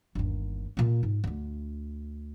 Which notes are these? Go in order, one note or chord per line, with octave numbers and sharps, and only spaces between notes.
G1 D#2
A#2 A#3
G#2
D2 D3